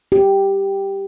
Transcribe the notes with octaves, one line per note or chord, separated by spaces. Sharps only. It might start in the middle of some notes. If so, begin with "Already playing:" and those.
G4